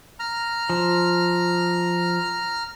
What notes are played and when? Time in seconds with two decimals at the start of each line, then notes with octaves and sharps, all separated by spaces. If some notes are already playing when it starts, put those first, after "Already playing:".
0.20 A#5 F6
0.70 F3